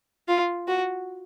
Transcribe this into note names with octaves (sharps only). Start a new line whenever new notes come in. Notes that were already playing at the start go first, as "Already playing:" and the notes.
F4
F#4